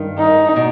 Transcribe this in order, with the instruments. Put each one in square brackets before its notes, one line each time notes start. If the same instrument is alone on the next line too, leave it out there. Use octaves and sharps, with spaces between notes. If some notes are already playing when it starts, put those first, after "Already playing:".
Already playing: [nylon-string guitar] G2 D#3
[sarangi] D#4
[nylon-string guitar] B2